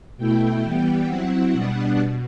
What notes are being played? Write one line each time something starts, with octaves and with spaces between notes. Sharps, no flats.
B2 A3 E4 G5
E3 G3 B3
F#3 C4 E4 F#5
B2 G3 B3 D4
B2